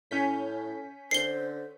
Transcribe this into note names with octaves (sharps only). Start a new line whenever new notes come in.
A2 C#4 G6 B6
D3 C5 C7 G7